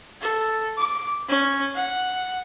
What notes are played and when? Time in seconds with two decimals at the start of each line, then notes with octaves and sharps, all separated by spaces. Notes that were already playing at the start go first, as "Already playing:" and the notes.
0.21 A4
0.78 D6
1.29 C#4
1.75 F#5